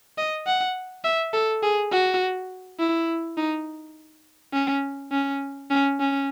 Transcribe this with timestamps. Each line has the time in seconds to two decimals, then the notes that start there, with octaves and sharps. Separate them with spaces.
0.18 D#5
0.46 F#5
1.04 E5
1.33 A4
1.63 G#4
1.92 F#4
2.79 E4
3.37 D#4
4.53 C#4
5.12 C#4
5.71 C#4
6.00 C#4